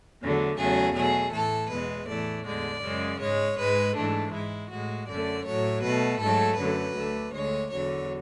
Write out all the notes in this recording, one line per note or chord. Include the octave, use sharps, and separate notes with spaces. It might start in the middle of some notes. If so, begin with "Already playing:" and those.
E2 D3 F#3 A3
E2 C#3 F#3 A3 G#4
B2 F#3 A3 G#4
A2 E3 A3 A4
E2 B2 G#3 B4
A2 E3 A3 D5
E2 D3 G#3 D5
F#2 C#3 G#3
G#2 G#3 C#5
G#2 G#3 B4
G#2 E3 A3 D4
G#2 G#3 E4
A2 G#3 F#4
F#2 D3 A3 D5
A2 F#3 A3 C#5
B2 A3 B4
G#2 F#3 A3 A4
F#2 D3 F#3 A3 B4
D2 D3 A3
D2 D3 G#3 C#5
E2 D3 F#3 C#5